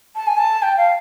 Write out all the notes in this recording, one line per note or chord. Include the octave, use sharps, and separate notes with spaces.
A5
G#5
A5
G5
F5